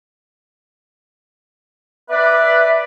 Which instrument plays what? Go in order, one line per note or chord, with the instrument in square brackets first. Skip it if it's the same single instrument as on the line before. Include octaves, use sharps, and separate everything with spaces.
[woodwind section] B4 D5 [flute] E5